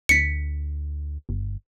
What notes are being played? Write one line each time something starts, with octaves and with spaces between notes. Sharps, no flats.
D2 B6 C#7
G1